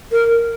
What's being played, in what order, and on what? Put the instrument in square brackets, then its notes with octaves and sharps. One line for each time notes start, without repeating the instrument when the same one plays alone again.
[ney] A#4